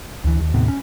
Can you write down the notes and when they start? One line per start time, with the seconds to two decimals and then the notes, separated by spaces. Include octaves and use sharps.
0.24 D2 E3
0.40 D#2
0.54 D#2 A2 C3 B3
0.68 C#4